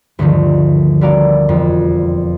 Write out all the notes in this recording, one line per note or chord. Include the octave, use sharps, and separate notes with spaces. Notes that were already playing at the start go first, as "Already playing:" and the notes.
D2 G2 D3 D#3 F3
G3 B3 F#4 A#4 D5 F5
E1 F2